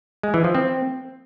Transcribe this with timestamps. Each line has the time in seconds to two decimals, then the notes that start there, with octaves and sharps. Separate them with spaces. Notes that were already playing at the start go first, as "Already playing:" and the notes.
0.23 G#3
0.34 E3
0.44 F3
0.55 C4